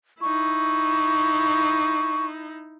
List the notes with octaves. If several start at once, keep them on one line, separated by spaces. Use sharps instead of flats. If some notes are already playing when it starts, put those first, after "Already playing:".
D#4 E4 C#6